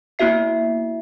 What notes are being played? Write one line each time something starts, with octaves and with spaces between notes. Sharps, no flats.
A#3 B3 E4 F#4 E5 C7